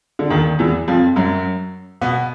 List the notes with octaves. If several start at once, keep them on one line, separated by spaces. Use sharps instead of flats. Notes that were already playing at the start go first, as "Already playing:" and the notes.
D3
D#2 D#3
E2 E3
F2 F3
F#2 F#3
B2 B3